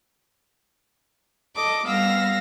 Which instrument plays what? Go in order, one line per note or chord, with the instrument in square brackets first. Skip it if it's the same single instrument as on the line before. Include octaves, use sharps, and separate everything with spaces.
[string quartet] A4 D#5 D6
G3 B3 F5 E6 A#6